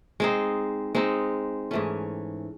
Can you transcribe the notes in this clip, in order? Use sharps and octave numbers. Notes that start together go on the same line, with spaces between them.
G#3 C4 D#4
G#3 C4 D#4
G#2 E3 A3 C#4